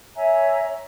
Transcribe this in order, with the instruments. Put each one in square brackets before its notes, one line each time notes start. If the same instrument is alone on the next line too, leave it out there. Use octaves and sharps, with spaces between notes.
[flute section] C#5 E5 G#5 A#5